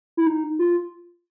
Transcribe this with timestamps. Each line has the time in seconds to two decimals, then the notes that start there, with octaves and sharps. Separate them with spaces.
0.17 E4
0.27 D#4
0.59 F4